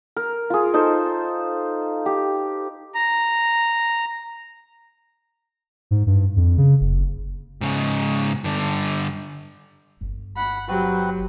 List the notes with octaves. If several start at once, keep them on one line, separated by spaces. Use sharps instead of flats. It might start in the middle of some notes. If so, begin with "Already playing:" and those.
A#4
F4 G#4
D#4 A4 C5
G4
A#5
G#2
G2
F2
C#3
F#1
G#2 C#3
G2 D3
G1
F#5 B5
F#3 C4 F#4 G4 B4